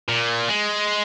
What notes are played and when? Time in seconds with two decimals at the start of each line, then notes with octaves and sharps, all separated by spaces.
0.09 A#2
0.48 G#3